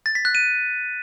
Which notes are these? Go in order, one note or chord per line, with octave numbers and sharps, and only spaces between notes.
A6
B6
F#6
D#7